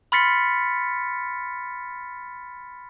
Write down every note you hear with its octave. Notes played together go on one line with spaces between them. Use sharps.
B5 C6 F6 A6 B6 C#7